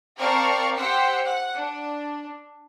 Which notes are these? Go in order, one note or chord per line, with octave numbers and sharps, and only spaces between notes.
C4 A#4 D5 F5 A5 C#6
G4 C5 F#5 E6 B6 C#7
F#5
D4